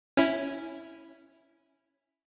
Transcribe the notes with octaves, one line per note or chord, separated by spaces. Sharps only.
C#4 E4